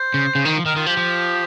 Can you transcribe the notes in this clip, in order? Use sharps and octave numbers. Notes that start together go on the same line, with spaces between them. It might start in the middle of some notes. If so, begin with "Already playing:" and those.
Already playing: C5
C#3
C#3
D#3
F3
D#3 A#4
D#3 F4
F3 G4
F3